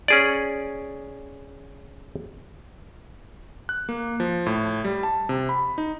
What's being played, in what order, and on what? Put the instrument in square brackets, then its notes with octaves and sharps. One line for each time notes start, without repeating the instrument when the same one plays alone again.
[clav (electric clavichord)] C#4 G#4 D5
[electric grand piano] F#6
A#3
F3
A2
G3
A5
C3
B5
D#4